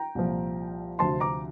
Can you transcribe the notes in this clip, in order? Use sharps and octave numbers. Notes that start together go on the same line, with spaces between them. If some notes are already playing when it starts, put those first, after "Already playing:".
Already playing: G5 A#5
C2 A#2 F3
D2 C3 F3 C4 A5 C6
A#5 D6